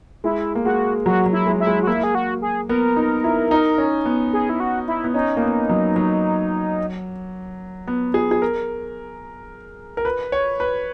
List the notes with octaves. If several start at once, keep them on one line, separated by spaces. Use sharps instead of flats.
G#3 E4
A#3
G#3 F#4
F#3 F#4
F#3
E4
G#3
E4
G#3
F#4
A#3 E4
G#4
F#4
G#4
B3 A#4
D#4
E4
D#4
C#4
B3
G#4
E4
F#4
E4
B3
C#4 D#4
A#3
B3
F#3
F#3
B3
G#4
G#4
A#4
A#4
B4
C#5
B4